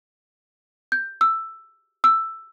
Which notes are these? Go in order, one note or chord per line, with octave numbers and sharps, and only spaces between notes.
G6
E6
E6